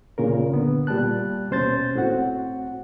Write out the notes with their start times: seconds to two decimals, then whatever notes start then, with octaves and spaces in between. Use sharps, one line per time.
0.18 C#2 G2 A#2 C#3 A#4
0.51 D3 B3
0.87 A#2 G3 A#3 A5 F#6
1.50 D#2 B2 C#4 C5 G6 A6
1.95 A2 C4 F#4 F#5